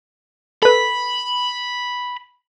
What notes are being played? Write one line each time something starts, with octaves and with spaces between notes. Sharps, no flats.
A4 B4 B5